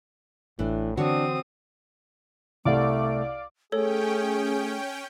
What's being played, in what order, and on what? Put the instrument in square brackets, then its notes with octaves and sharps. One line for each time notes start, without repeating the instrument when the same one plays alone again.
[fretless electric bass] A1 [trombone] A2 [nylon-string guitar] E3 D4
[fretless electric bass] D3 E3 [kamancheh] C4 D#6 [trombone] D4 [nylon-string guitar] F#4 C#5
[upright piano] C2 [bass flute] A3 [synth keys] D5 F5 D6
[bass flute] A3 [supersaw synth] C#4 G5 [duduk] G#4 [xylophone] A4 C#5